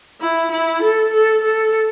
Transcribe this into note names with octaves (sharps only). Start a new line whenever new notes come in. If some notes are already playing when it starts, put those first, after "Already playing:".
E4
E4
A4
A4
A4